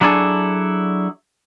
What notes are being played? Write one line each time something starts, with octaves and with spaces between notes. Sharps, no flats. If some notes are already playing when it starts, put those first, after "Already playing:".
F#3 D4 E4 G#4 A4